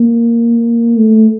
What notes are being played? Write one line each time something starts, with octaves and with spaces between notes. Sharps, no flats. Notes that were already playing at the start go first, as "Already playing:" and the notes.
Already playing: A#3
A3